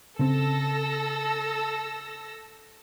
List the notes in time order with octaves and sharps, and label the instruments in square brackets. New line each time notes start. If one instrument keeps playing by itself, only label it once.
[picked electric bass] C#3 C4 [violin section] A4 E6 A#6